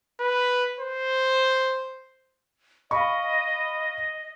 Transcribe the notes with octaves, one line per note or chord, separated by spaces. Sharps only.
B4
C5
D#5 F5 B5 C#6